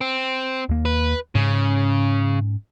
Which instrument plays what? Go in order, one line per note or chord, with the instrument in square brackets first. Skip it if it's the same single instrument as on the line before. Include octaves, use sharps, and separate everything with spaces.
[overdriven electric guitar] C4
[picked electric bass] D#2 A#3
[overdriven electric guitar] B4
[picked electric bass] G#2 C#4 [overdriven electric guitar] C#3